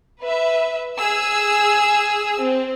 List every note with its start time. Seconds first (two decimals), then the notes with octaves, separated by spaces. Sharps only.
0.21 B4 E5
0.97 G#4 E6
2.42 C4